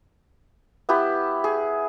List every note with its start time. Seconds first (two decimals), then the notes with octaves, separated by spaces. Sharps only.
0.89 B3 E4 G4
1.44 G#4